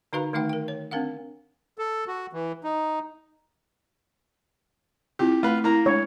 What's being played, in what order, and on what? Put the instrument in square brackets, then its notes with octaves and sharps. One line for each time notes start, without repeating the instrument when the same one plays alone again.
[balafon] D3 D#4 F#4 B4 F5 A#5
D#3 A3 D#4 F#5 G5
A#4 G5
C#5
C4 D4 A#4 F5 F#5
[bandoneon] A4
F#4
E3
D#4
[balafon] C4 E4 F4 [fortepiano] G4
[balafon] A3 [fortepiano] F4 B4
[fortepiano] A#3 A#5 [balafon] E4
[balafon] G#3 D4 [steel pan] C#5